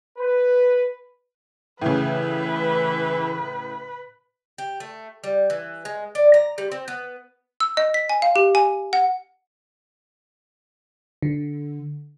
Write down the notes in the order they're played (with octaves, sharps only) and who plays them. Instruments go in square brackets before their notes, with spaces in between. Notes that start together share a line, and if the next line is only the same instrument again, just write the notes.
[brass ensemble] B4
[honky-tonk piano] A2 C#3 [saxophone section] E3 [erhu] B4
[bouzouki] G4
A3
G3
E3
G#3
D5
A#5
G3
C4
B3
[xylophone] E6
D#5
B6
G#5
F5
G4
G#5
F#5
[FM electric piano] D3